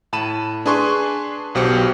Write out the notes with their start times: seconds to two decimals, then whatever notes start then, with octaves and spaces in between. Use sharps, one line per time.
0.13 A2 A5 B5 D#7 E7
0.66 D4 G#4 B4 G#5 C6 C#6
1.55 B1 B2 G4 C5 C#7